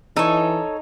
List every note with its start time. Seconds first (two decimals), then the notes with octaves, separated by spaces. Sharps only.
0.17 E3 D#4 A4 C#5